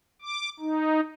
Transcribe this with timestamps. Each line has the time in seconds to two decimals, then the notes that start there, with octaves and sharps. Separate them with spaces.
0.21 D6
0.60 D#4